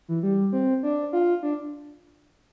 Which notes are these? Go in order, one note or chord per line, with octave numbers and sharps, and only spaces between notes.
E3
G3
C4
D4
F4
D4